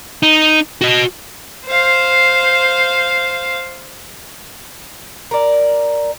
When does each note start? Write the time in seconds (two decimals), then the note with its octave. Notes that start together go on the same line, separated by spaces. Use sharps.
0.23 D#4
0.81 F#4 D#5
1.66 C5 F5
5.31 A#4 D5